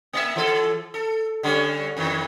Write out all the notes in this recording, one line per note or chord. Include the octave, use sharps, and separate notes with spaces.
A#3 D#5 E5
E3 A4
A4
D3 G3 C#4
F2 D#3 E3